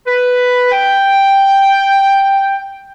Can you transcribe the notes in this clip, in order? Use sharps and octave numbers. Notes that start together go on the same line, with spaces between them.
B4
G5